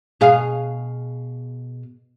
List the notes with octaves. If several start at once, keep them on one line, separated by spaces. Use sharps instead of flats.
B2 G#4 F5